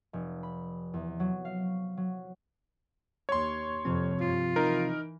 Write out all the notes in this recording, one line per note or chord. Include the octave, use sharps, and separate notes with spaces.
F1
B5
E2
F#3
F5
F#3
D#2 C#5 C6
F2 C3 F3 C4
G2 F4
E3 D#4 A#4